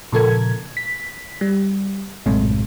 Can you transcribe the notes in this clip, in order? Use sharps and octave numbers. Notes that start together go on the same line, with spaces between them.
A#2 C#3 F3 A4 A#4 G#6
B6
G3
A#1 F#2 A2 C3 G#3 A3